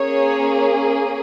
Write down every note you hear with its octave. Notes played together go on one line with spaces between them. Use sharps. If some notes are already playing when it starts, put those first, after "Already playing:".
Already playing: A#3 C#4 G#4 C#5